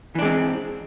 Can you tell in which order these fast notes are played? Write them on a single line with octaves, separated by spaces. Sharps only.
E3 D4 G#3 C4